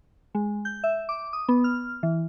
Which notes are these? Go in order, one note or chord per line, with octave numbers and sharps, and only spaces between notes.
G#3
G6
E5
D6
D#6
B3
F6
E3